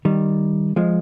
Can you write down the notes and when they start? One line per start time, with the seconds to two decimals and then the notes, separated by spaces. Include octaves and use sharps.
0.05 D#3 G3
0.76 F3 G#3